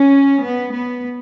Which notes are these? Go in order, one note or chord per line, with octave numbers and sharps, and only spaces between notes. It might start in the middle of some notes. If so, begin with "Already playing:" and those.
Already playing: C#4
B3
B3